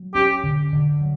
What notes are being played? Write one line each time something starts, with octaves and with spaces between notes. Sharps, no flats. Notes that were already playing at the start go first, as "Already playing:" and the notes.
Already playing: F#3
C#4 G4
D3
D3
F#3